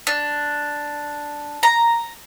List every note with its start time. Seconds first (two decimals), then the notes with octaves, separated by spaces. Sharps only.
0.07 D4
1.63 A#5